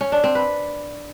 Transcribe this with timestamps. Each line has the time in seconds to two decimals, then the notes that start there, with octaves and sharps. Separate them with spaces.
0.01 C#4
0.12 D4
0.24 C4
0.35 B4